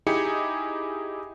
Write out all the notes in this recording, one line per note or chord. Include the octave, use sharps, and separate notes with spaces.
D#4 E4 G4 G#4 G#5 C#7